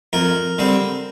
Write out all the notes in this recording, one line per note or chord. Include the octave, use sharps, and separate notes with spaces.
F2 A#4
D3 G3 C4